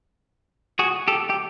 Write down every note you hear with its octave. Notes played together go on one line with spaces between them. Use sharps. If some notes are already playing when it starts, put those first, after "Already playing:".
F#4 G#4
G4 A4
G4